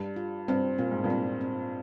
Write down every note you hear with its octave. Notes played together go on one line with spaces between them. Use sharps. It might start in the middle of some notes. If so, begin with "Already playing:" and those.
Already playing: G2 G3
F4
G2 C4
A#2 C4
G#2
G2 A#2
C4
C4